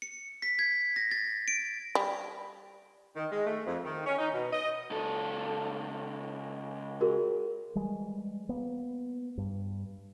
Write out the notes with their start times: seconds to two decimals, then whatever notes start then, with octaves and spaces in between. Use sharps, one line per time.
0.02 C#7
0.42 B6
0.59 G#6
0.96 A#6
1.11 A6
1.48 D7
1.95 G3
3.16 D#3
3.32 G#3
3.46 A3
3.67 F2
3.84 D#3
4.06 C#4
4.19 D#4
4.33 B2
4.53 D#5
4.91 C#2 A4
7.01 F#4 G#4 A#4
7.75 E3 G3 G#3
8.49 A#3 B3
9.38 G2